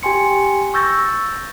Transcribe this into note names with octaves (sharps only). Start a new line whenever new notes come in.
G4 G5 G#5 C6 C#7
C#6 E6 G6 A6 A#6